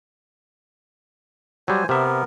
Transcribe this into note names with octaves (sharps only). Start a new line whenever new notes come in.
F#3 G3 C5 G#5
C3 B3 A#4 E5